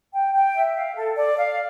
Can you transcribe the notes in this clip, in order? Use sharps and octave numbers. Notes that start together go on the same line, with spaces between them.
G5
G5
E5
F5
A4
D5
F5